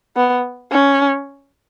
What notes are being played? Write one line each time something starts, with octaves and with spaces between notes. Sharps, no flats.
B3
C#4